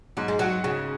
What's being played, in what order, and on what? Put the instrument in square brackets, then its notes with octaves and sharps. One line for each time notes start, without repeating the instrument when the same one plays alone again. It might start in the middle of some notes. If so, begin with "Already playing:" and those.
[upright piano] G#2 [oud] F#3
[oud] G#3
[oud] F#3 [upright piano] F#4
[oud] C#3 [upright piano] F#4